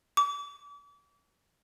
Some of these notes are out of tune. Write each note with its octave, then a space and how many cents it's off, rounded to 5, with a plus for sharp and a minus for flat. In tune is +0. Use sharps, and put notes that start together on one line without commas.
D6 -40